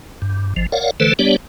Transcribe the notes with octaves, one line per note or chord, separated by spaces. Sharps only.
G2
G#1 F3
A#4 C#5 D5 F5 F#5
D3 E3 A3 A4 B4 C5
G3 B3 D4 G4 C#5 D5